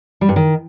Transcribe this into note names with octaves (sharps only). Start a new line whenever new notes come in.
G3
G2
D#3